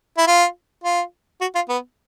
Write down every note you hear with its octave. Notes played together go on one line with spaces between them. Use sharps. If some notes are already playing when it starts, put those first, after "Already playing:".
E4
F4
F4
F#4
F4
B3